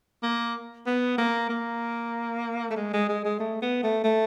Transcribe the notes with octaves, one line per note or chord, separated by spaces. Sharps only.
A#3
B3
A#3
A#3
A3
G#3
G#3
G#3
G#3
A3
B3
A3
A3